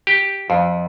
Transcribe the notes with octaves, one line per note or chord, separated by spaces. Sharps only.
G4
F2